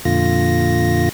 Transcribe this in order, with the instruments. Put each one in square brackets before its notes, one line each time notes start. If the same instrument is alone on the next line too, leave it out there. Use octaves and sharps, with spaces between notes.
[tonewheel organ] F2 A#2 D3 F4 A#6